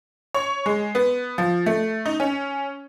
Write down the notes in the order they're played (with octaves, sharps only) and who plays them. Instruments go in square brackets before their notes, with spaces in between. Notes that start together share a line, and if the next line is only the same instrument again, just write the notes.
[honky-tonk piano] C#5
G#3
B3
F3
A3
D#4
C#4